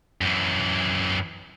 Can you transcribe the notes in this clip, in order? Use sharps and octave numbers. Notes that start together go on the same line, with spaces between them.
F#2 E3